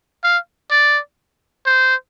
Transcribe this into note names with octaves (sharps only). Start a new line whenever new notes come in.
F5
D5
C5